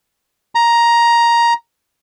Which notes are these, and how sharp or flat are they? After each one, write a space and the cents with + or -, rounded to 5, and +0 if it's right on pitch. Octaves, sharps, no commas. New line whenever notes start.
A#5 +10